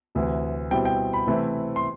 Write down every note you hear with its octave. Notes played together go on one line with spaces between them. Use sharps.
D2 C3 E3
B2 G3 C4 E4 G5
G5
B5
C3 E3 A3 C4 E4
C6